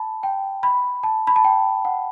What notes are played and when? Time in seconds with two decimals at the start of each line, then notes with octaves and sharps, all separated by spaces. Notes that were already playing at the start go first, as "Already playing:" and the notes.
Already playing: A5 B5
0.23 G5
0.63 B5
1.03 A5
1.27 B5
1.36 A5
1.44 G5
1.85 F#5